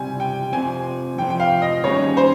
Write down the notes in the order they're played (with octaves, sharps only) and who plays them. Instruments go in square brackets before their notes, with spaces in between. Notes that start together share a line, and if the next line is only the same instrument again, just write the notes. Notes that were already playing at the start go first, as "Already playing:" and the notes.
Already playing: [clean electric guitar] C#2 C3 G3 [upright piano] G#5
[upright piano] G5
[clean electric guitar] F2 C3 F3 C4 [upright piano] G#5
[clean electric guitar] F2 C3 F3 C4 [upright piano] G5
[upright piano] G5
F5
D#5
[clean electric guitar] D#3 G3 A#3 C#4 G#4 [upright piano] C#5
[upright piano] C5